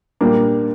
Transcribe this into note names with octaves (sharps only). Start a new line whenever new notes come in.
A#2 G3 A#3 D4